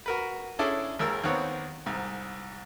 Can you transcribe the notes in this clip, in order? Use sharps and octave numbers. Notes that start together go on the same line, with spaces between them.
F#4 A#4 B4
C#4 D4 E4 G#4 A4 D5
G#1 D#2 G#3 A#4 E6
D#2 D#3 B3 C4 C#5 F#5
C2 G#2